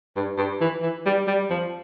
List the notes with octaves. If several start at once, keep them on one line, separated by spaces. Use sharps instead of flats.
G2
G2
E3
E3
G3
G3
F3